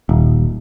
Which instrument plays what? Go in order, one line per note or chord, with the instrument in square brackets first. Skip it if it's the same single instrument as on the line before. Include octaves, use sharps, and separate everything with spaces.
[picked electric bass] D#1